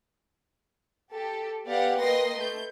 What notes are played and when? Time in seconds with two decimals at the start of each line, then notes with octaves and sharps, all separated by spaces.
1.12 G4 A4
1.66 B3 G4 D5 F5 F#5
1.98 A#3 B4 D#5 G5 C6 A#6
2.38 A3 G6